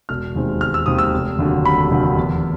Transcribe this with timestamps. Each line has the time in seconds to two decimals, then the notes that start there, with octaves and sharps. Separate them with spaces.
0.09 E1 F6
0.35 D#2 D#3 G#3 C4
0.61 E1 F6
0.74 E6
0.86 D#2 D#3 G#3 C4 D#6
0.99 E6
1.13 F1
1.39 D#2 D3 F#3
1.65 F1 B5
1.91 D#2 D3 F#3
2.17 E2